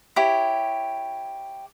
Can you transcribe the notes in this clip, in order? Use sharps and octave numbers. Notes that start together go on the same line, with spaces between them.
E4 G4 C#5